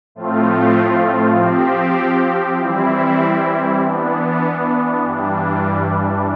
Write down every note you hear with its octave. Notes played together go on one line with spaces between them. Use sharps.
A2 F3 A3 C4 F4
F3 C4 G4
E3 G3 C4 E4
E3 B3 D4
G2 E3 G3 D4